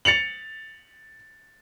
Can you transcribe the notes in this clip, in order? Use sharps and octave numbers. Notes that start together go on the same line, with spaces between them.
A6 C#7 F7 F#7